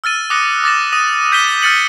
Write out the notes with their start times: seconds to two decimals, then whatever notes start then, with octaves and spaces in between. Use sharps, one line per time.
0.04 E6 F6 A6 D#7
0.30 D6 D#6 F#6 A#6 C#7
0.64 D6 A6 A#6 E7
0.93 D#6 A#6 D#7
1.32 G6 B6 D#7 E7 G7
1.62 E6 F6 A6 C#7 F#7